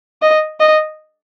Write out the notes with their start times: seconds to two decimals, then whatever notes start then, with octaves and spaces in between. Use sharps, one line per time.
0.22 D#5
0.60 D#5